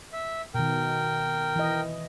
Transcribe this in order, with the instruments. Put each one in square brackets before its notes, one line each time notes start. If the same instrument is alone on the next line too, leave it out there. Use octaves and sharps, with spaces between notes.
[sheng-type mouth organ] E5
[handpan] B2 D#3 [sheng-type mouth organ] A#4 G5
[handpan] E3 D#5